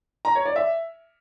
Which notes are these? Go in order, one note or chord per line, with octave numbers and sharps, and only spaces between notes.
A#5
C#5
D5
E5